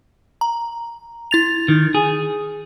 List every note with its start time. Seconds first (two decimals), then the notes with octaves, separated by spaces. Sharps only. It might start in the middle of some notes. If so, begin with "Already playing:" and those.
0.41 A#5
1.31 E4 A6 F7
1.68 D#3
1.95 G#4